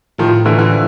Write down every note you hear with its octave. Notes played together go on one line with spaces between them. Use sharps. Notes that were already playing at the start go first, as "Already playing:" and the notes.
A2 D#3 F3
D3 E3 A3
D3 E3
F3